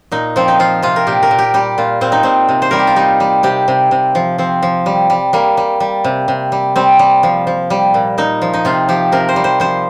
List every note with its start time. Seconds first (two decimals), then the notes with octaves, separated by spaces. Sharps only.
0.11 A#2 D#4
0.36 F3 C4
0.48 D#4
0.59 F3 F4
0.82 C3 F4
0.96 A#4
1.07 A#2 G4
1.23 A#4
1.31 A#2
1.39 G4
1.54 G3 G4
1.78 A#2 F4
2.01 A#2 C4
2.12 D#4
2.23 A#2 C4
2.49 C3
2.62 C5
2.71 G3 A#4
2.79 G4
2.87 F4
2.96 G3 D#4
3.20 G3
3.43 C3 G4
3.68 C3
3.91 C3
4.15 F3
4.38 F3 C4
4.62 F3
4.86 G3
5.10 G3
5.33 G3 A#3
5.57 G3
5.80 G3
6.04 C3
6.28 C3
6.52 G3
6.76 G3 C4
6.99 G3
7.23 F3
7.47 F3
7.70 G3
7.94 A#2
8.18 A#2 D#4
8.42 F3
8.54 D#4
8.65 C3 F4
8.89 F3 G4
9.12 C3 A#4
9.29 C5
9.36 G3
9.44 C5
9.60 F3 C5